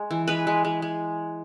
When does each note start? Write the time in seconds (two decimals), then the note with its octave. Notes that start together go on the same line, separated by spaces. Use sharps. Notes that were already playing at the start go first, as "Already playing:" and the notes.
Already playing: G#3
0.11 E3
0.28 G#3 B4
0.47 G#3
0.65 G#3
0.82 G#3